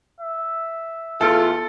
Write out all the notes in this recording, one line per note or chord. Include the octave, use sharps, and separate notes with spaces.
E5
E2 A3 F4 A4